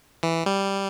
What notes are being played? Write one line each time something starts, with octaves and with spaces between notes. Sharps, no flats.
E3
G3